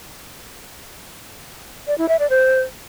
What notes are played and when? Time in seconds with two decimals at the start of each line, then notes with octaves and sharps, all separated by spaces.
1.87 D5
1.98 E4
2.09 E5
2.19 D5
2.30 C5